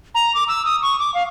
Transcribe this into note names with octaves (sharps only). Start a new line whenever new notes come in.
A#5
D6
E6
D#6
C#6
D6
F5